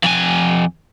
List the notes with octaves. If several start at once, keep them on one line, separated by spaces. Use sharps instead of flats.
F2 G#5